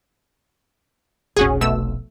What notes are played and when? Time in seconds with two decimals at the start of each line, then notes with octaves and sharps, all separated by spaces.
1.36 F1 B1 C#4 F#4 G#4
1.61 B2 A3 E6